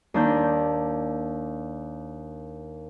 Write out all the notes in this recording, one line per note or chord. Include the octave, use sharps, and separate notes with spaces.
D#2 D4 G6